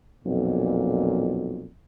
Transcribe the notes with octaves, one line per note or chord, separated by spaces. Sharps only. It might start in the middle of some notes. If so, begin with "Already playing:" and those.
B1 F2 A#2